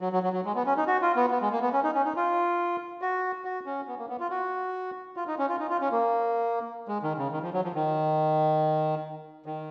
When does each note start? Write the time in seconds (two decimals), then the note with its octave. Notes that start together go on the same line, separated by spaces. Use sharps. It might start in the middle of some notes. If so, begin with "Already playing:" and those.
0.01 F#3
0.13 F#3
0.23 F#3
0.33 F#3
0.45 G#3
0.55 B3
0.66 C#4
0.77 D#4
0.87 F#4
1.02 F4
1.16 B3
1.31 B3
1.41 G#3
1.52 A#3
1.62 B3
1.73 C#4
1.83 D#4
1.94 C#4
2.05 D#4
2.16 F4
3.01 F#4
3.45 F#4
3.66 C#4
3.88 B3
3.98 A#3
4.09 B3
4.20 F4
4.30 F#4
5.16 F4
5.27 D#4
5.39 C#4
5.49 F4
5.59 D#4
5.70 F4
5.81 C#4
5.92 A#3
6.88 G#3
7.03 D#3
7.18 C#3
7.32 D#3
7.42 F3
7.53 F#3
7.64 F3
7.75 D#3
9.46 D#3